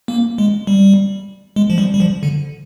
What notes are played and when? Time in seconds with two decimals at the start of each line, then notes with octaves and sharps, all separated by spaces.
0.08 A#3
0.38 G#3
0.67 G3
1.56 G#3
1.70 F3
1.78 G3
1.94 G3
2.00 F3
2.23 D3